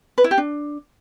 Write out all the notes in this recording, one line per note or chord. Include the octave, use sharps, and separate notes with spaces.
B4
E4
G4
D4